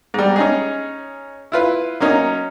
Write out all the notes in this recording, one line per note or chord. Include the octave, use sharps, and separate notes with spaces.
G#2 G3
C#4 D#4 G#4
E4 F4 B4
F#3 A#3 C#4 D#4